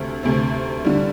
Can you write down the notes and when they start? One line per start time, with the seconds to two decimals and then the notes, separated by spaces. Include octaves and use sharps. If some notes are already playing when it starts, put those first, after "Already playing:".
Already playing: D2 C3 A3 C4
0.23 D2 C3 A3 C4
0.85 D3 G3